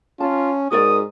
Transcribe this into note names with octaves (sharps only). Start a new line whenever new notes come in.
C#4 F4 A5
G#2 F#4 A#4 D5 D#6